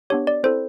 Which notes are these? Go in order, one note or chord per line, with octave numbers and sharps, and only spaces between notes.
B3 D4 G4 C#5
D5
C4 E4 A4 C5